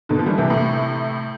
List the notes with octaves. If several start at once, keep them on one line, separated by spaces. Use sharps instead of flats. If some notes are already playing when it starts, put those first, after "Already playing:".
B2 D3
F3
E3 G3
C3 E3
A2 C3